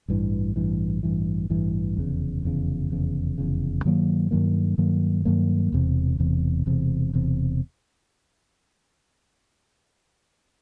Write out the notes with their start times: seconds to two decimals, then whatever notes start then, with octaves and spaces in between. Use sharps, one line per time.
0.08 A1 G2 E3
0.56 A1 G2 E3
1.03 A1 G2 E3
1.50 A1 G2 E3
1.96 F1 E2 C#3
2.43 F1 E2 C#3
2.90 F1 E2 C#3
3.38 F1 E2 C#3
3.85 G2 D#3 F#3 A#3
4.31 G2 D#3 F#3 A#3
4.78 G2 D#3 F#3 A#3
5.25 G2 D#3 F#3 A#3
5.72 E1 E2 C3
6.18 E1 E2 C3
6.66 E1 E2 C3
7.13 E1 E2 C3